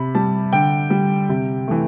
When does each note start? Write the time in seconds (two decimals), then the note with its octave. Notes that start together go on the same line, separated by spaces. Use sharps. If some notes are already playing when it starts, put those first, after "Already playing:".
Already playing: C3 B5
0.15 G3 A5
0.53 D3 G5
0.90 G3
1.29 C3
1.68 E3 A3